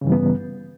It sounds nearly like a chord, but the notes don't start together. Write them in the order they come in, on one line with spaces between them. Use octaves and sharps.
C#3 G2 E3 G3 B3